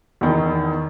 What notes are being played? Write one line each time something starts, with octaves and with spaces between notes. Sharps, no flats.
E2 D#3